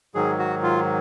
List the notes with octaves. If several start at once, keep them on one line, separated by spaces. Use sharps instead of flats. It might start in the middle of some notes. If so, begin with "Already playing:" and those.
G#2 D#3 F#3 G#4
F#4
F4